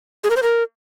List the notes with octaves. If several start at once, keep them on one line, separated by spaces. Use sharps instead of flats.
G#4
A#4
C5
A#4